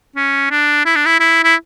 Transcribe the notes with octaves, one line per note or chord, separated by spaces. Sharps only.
C#4
D4
E4
D4
E4
E4
E4